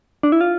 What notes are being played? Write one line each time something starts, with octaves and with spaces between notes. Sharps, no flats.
D4
E4
F4